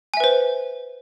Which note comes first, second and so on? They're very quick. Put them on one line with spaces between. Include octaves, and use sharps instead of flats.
G#5 E5 B4 C5